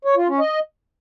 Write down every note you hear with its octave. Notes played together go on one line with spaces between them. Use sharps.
C#5
F4
C#4
D#5